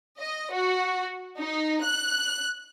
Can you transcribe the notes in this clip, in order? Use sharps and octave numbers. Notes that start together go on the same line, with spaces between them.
D#5
F#4
D#4
F#6